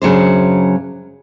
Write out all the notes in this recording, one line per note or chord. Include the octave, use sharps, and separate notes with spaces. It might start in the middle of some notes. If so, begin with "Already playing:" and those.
F#2 C#3 F#3 D4 C5